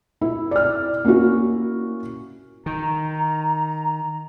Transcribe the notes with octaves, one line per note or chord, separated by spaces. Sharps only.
E4
D5 F6
A#3 C#4 E4 F#4
D#3 A#5